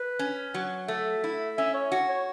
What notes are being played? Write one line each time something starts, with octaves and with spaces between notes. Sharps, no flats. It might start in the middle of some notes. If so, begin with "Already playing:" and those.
Already playing: B4
C#4
F#3
A3 E5
E4
C#4 E5
C#5
F#4
C#5